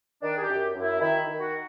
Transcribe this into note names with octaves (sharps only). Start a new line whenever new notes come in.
D#3 D4
G#4
G4
F#2
F#2
E4
D#3 E4
D#3
F#4